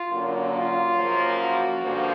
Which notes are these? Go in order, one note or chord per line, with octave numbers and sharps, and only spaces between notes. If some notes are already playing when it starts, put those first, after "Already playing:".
Already playing: F4
F#2 D3 F#3 A#3
F4
F#2 C#3 F3 A#3
F#4
G2 D3 F3 A#3